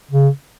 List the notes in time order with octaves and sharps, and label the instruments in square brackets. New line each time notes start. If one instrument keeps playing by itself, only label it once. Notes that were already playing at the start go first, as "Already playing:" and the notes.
[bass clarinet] C#3